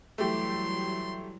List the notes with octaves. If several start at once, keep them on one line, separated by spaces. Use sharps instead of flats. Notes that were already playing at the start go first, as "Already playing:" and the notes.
E3 F#3 G3 A3 G4 C6